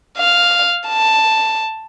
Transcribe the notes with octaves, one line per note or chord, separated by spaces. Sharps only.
F5
A5